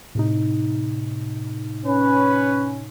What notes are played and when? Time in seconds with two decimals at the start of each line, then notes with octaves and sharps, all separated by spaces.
0.15 A2 C3 D#4
1.86 C#4 B4